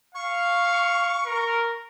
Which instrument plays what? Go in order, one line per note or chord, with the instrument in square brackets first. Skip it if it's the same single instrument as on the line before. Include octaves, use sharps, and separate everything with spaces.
[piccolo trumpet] F5 [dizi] C#6
[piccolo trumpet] A#4